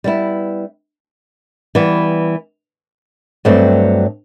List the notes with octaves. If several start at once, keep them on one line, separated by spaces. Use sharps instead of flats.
G3 B3 E4
E3 G3 B3
G2 F#3 A3 C4